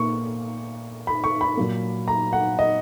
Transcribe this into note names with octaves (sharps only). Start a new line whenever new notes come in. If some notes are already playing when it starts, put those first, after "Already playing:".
Already playing: A#2 A#3 C#6
B5
C#6
B5
A#2 F#3 A#3
A#5
F#5
D#5